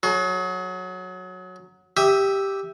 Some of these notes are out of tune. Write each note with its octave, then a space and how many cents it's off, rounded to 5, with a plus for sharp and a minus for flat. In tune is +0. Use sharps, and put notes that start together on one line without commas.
F#3 -10 G#4 +40
G4 +0 E5 +0 D#6 +25